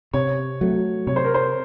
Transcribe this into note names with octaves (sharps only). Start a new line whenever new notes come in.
C3 C#5
F#3 A3
C3 C#5
C5
A#4
C5